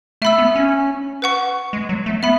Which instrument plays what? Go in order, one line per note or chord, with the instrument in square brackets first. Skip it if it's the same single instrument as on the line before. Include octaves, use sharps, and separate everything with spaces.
[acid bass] A3 [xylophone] E5 B5 E6
[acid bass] B3
C#4
[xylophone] B4 F#5 C#6
[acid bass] G#3
F#3
A3
[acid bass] B3 [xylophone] E5 B5